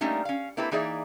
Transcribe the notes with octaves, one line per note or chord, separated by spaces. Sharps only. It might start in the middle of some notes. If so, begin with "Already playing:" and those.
G3 A3 A#3 C#4 D#4
C#4 F5
A#3 C4 E4 G4 A4 B4
E3 A#3 D#4 G#4 D5 E5